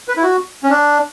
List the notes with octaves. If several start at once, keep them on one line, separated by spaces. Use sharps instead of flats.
B4
E4
F#4
C#4
D4